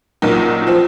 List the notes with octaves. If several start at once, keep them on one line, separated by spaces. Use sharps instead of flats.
A#1 A#2 F#3 A#3 D#4
F3 C4